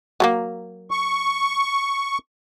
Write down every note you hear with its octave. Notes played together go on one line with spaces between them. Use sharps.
F#3 A3 A#3
C#6